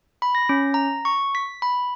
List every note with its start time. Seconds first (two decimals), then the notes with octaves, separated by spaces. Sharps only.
0.22 B5
0.35 A#6
0.49 C#4
0.74 A#5
1.05 C#6
1.35 B6
1.62 B5